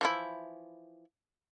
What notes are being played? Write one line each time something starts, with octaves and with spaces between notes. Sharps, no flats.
E3 F3 E4